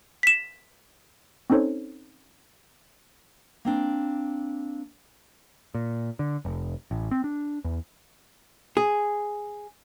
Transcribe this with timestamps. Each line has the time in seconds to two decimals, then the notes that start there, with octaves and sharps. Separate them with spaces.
0.23 B6 E7
1.50 C4 C#4 D#4 A4 C5 C#5
3.65 A#3 C4 D4
5.74 A#2
6.19 D3
6.45 F1
6.91 A1
7.11 C4
7.24 D4
7.64 E2
8.77 G#4